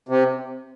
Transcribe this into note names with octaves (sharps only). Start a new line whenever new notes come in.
C3